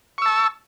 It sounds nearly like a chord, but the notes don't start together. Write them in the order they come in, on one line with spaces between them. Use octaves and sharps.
C#6 E6 A5